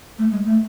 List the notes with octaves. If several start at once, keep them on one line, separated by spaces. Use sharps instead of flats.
A3
G#3
A3